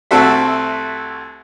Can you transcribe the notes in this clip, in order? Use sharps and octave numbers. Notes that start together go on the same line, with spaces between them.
C2 A3 C4 F#4 A4 E5